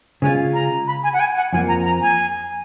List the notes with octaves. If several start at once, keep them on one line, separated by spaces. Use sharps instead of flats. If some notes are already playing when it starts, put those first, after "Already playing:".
C#3 G#3 C#4 F4 G#5
A#5
B5
G#5
F#5
G#5
F#5
F2 F3 A#3 G#5
A#5
A#5
G#5